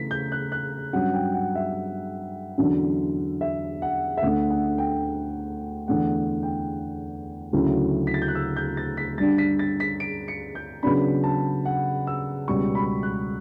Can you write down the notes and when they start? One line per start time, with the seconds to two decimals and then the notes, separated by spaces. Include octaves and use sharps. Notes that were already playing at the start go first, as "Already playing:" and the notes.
Already playing: C#3 E3 A3 B6
0.11 G6
0.32 F#6
0.52 F#6
0.93 G2 F#3 C#4 F#5
1.14 G5
1.34 F#5
1.55 E5
2.58 E2 D3 F#3 C#4
3.41 E5
3.82 F#5
4.17 E5
4.23 D2 D3 A3 F#5
4.50 F#5
4.78 G5
5.88 E2 D3 A3 F#5
6.43 G5
7.53 D2 C#3 F#3 C#4 E4
8.07 B6
8.14 A6
8.22 G6
8.28 F#6
8.35 E6
8.56 G6
8.77 A6
8.97 B6
9.17 G2 D3 G3 D4 A6
9.38 B6
9.59 A6
9.80 B6
10.00 D7
10.28 C#7
10.55 G6
10.83 C#3 F#3 B3 D4 B5
11.24 A5
11.65 F#5
12.07 E6
12.48 C#2 B2 G3 C#4 C#6
12.75 B5
13.03 F#6